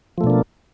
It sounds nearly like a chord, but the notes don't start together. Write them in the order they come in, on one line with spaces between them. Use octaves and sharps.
F3 A3 B2 D4 A#3